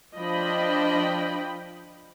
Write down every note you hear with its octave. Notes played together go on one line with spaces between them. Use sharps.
F3 D4 D#5 G5 B5